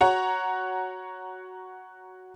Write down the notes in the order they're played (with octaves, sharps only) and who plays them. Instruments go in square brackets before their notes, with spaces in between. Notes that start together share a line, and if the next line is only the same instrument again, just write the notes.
[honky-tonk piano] F#4 C#5 F#5 A#5